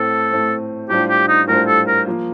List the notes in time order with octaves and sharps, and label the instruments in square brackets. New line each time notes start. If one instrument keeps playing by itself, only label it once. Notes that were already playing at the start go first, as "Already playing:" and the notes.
Already playing: [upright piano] A2 A3 C4 [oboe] A4
[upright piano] A2 A3 C4
[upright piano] A2 G3 D4 F4 C5 [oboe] G4
[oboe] G4
D#4
[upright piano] A2 G3 D4 F4 C5 [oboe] A#4
[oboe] A4
A#4
[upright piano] F3 A#3 F4